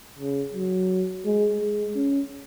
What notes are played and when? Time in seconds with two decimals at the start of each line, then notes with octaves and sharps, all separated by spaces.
0.18 C#3
0.54 F#3
1.25 G#3
1.60 G#3
1.96 C#4